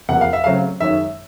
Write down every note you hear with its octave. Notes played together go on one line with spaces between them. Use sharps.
E2 C3 F3 A#3 F#5
F5
E5
C#3 F#3 A3 C4 F5
F#2 D#3 G#3 C#4 E5